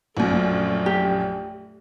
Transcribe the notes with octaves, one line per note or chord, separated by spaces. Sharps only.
A#1 F#2 A3
G4